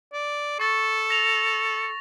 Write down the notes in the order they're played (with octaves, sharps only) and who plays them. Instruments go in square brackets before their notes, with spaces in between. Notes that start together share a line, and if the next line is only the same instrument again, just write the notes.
[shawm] D5
[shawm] A4 [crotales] C#6 A6
[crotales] A#6 F7